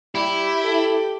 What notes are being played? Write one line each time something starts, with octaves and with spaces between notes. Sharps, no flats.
G3 E4 G4
A4